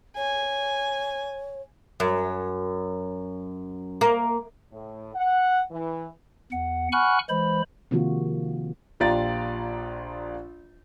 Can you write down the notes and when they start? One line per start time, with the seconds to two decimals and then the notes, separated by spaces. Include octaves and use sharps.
0.17 C#5 G#5
2.00 F#2
4.01 A#3
4.72 A2
5.15 F#5
5.71 E3
6.52 E2 F#5
6.92 F#5 G#5 B5 C#6 F6 F#6
7.29 E3 G#3 C5 B5
7.91 C3 D#3 F3 A#3 F4 F#4
9.00 A#1 F4 G4 D5 A#5 A6